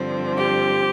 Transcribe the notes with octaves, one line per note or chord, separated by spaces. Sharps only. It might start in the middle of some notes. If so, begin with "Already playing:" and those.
Already playing: G2 D3 F3 C4
G4